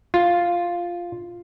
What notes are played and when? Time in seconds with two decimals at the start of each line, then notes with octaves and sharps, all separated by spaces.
0.14 F4